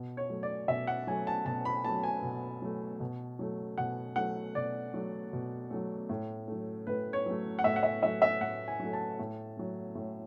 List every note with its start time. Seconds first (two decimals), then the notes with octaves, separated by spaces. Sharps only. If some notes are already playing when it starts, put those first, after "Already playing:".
Already playing: B2
0.17 C#5
0.30 F#3 A3
0.43 D5
0.68 B2 E5
0.87 F#5
1.07 F#3 A3 G#5
1.27 A5
1.46 B2 A5
1.65 B5
1.84 A3 A5
1.89 F#3
2.03 G#5
2.23 B2
2.62 F#3 A3
3.00 B2
3.39 F#3 A3
3.78 B2 F#5
4.16 F#3 A3 F#5
4.55 B2 D5
4.94 F#3 A3
5.33 B2
5.70 F#3 A3
6.09 A2
6.48 F#3 A3
6.87 A2 B4
7.13 C#5
7.26 F#3 A3
7.59 F#5
7.64 A2 E5
7.76 F#5
7.83 E5
8.03 F#3 A3 E5
8.22 E5
8.41 A2 F#5
8.68 G#5
8.80 F#3 A3
8.93 A5
9.19 A2
9.57 F#3 A3
9.95 A2